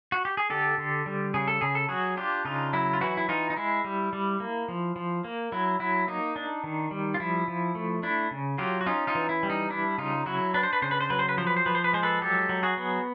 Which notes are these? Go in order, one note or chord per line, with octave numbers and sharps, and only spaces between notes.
F#4
G4
G#4
D3 G4 A4
D3
G3
C#3 G#4
A4
C#3 G#4
A4
F#3 F#4 G#4
D4 F4 G4
C#3 D#4 F4
F#3 E4
F4
E3 E4 F#4
E4
E3 D#4 F4
D#4
G#3 E4
G3
G3
A#3
F3
F3
A#3
F#3 E4
F#3 E4
A#3 D#4
D4
D#3
G3
F4
F3 E4
F3
A3
D4 E4
C#3
F#3 F4 G4
F#4
C#4 D#4 F4
D#4 F4
E3
E4
G3
D#4
D4 E4
C#3 D#4 F4
F#3 E4 F#4
D4 B4
C5
B4
C#3 C5
B4
C5
F#3 B4
C5
B4
F3 C5
B4
C5
F3 B4
C5
B4
G#3 C5
A4 B4
F#3 G4 A4
F#3
F#4 G#4
B3